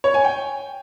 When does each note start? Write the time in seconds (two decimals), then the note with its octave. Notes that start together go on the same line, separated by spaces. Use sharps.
0.04 C#5
0.14 G#5
0.25 G5